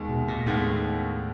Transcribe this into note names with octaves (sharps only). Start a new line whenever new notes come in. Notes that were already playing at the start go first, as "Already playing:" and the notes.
Already playing: D#2 D#3 G#3 B3
B2
A#2
D#2 A2 D#3 G#3 B3